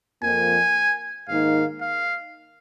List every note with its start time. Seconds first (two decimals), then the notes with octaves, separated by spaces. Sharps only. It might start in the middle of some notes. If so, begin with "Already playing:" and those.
0.22 F2 F3 A#3 G#5
1.28 G#2 D#3 A#3 D#4 F5
1.81 F5